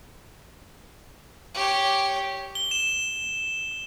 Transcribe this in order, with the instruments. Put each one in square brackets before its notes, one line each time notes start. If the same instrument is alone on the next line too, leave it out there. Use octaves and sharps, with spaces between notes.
[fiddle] G4 C#5
[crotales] G7
E7